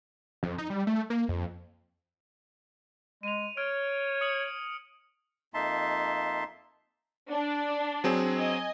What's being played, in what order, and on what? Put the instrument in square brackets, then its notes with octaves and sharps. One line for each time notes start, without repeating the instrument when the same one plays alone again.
[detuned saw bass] F2
D#4
G3
A3
A#3
F2
[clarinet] G#3 [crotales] D#7 F7
[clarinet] C#5 [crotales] F6 D7
[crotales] D#6 C#7 F#7
[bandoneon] F2 A#3 D#4 E5 A5 C6
[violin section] D4
[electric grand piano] F#3 C4 G#4
[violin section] D#5 G#5